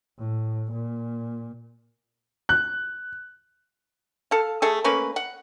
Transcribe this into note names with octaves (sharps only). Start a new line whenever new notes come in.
A2
A#2
F#6
A4 F5
A3 G#4 A4
A3 A#3 C#4 B4
F#5